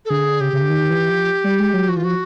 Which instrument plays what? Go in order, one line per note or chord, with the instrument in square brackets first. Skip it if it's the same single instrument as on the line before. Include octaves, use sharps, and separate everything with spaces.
[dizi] A4
[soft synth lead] D3 [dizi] G#4
[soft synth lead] C#3 [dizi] G4
[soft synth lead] C#3
D3
D#3
E3
F3
G3
G#3
F#3
[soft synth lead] F3 [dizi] F#4
[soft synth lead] E3 [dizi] F4
[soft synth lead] F3 [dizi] F#4